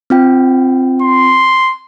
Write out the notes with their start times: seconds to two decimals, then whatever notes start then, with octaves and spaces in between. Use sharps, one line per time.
0.10 C4 F4 G5
1.02 C6